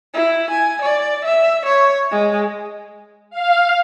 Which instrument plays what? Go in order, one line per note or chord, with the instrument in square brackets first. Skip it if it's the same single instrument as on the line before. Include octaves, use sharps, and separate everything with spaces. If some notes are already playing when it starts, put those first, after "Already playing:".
[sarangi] E4
G#5
D5
E5
C#5
G#3
[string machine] F5